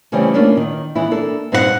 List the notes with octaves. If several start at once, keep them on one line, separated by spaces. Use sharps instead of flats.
C#3 E3 G3 A3 C4 C#4
A3 A#3 C#4 D4 F4
D#3
E3 G#3 B3 E4
A#3 D4 A4
G2 C4 D#4 F4 F#5